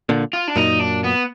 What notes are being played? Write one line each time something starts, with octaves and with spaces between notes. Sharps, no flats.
A#2 D3
F4
D4
F#2 A#2 D#4
D4
B3